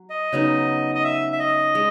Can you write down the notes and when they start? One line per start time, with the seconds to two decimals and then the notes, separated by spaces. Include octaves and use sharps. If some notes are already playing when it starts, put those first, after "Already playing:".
Already playing: F#3
0.10 D#5
0.33 C#3 F#3 B3 D#4
0.95 D#5
1.04 E5
1.33 E5
1.40 D#5
1.75 G#3